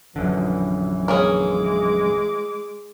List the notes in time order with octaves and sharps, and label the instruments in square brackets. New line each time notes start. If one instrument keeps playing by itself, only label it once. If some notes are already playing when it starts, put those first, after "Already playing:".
[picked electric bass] A#1 F#2 D3 [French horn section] E3
[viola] G#3 D6 [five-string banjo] A#3 C#4 G#4